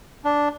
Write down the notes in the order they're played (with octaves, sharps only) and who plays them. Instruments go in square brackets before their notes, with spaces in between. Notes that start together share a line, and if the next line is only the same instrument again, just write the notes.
[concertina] D4